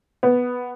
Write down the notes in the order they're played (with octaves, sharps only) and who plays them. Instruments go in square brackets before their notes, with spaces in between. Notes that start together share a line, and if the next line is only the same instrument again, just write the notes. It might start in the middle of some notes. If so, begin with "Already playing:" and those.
[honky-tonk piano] B3